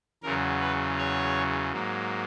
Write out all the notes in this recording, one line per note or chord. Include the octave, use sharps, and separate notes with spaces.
E2 C#3 F#3 A#4
B4
C#5
G#2 F#3 A#3